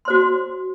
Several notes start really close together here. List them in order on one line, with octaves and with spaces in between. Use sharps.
C6 C5 F#4